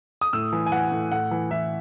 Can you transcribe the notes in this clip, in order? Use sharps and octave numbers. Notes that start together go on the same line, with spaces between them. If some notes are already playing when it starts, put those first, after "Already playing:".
D#6
A2 E6
E3
G#5
E3 F#5
A2
A2 F#5
E3
E3 E5